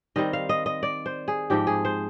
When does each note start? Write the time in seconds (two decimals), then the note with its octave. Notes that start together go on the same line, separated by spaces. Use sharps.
0.16 D#3 G3 C4 D#5
0.33 F5
0.49 D#5
0.66 D#5
0.83 D5
1.06 C5
1.28 G#4
1.50 G#2 F3 C4 G4
1.67 G#4
1.85 C5